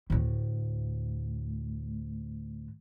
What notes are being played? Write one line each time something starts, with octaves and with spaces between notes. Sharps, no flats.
D2 A2